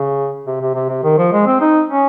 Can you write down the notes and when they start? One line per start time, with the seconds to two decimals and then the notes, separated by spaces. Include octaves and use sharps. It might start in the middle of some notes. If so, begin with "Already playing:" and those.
Already playing: C#3
0.47 C3
0.61 C3
0.75 C3
0.89 C3
1.03 D#3
1.18 F3
1.32 G#3
1.46 C4
1.61 D#4
1.89 C#4